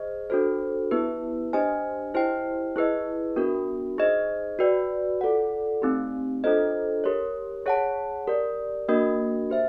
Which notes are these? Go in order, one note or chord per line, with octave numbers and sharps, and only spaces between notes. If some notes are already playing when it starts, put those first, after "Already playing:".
Already playing: G#4 C5 D#5
D4 F#4 A4 C5
B3 E4 G4 B4
D4 G4 C5 D#5 G#5
E4 G4 C5 D#5 G5
E4 G#4 B4 D#5
B3 D4 F#4 A#4
D#4 G#4 C5 D#5
F#4 B4 D5 G5
F4 A4 D5 F#5
A3 C4 D#4 G4
D4 F4 A4 C5 D#5
G4 A#4 C#5
G#4 C#5 F#5 A5
G4 A#4 D5
A#3 D4 F#4 A#4 D#5
G4 C5 E5